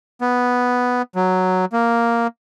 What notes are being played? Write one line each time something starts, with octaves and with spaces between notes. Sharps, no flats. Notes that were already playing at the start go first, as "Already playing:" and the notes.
B3
F#3
A#3